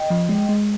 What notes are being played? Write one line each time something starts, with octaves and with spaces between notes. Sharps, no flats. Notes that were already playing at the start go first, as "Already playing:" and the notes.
Already playing: D#5 G5
F3
G#3
G#3